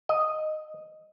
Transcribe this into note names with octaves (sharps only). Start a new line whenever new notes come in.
D#5